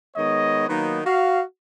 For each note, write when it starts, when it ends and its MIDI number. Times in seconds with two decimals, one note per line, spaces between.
0.16 0.68 51
0.16 0.68 56
0.16 0.68 59
0.16 0.68 73
0.16 0.68 75
0.68 1.01 51
0.68 1.01 54
0.68 1.01 58
0.68 1.01 59
0.68 1.01 63
0.68 1.01 71
1.06 1.41 66
1.06 1.41 77